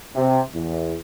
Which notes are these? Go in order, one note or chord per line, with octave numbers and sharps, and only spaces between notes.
C3
E2